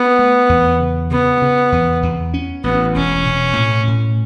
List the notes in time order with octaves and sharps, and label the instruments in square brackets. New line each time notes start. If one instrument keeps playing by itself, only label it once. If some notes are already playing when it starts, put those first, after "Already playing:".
Already playing: [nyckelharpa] B3
[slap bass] A3
E2
C#3
[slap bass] C#3 [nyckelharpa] B3
[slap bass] C#3
E2
E2
C#4
[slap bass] A1 [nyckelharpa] B3
[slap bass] E1 [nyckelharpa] C#4
[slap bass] B2
A2
A2